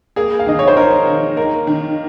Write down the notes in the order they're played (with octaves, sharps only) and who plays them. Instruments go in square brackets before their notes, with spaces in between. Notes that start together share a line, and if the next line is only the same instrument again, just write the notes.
[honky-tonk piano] A#3 [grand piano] G#4
[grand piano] F5
[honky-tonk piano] D#3 [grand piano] D#5
[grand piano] C#5
C5
[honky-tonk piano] D#4 [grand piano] A#4
[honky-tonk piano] D#3
[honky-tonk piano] A#3 [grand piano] A#4
[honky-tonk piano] D#3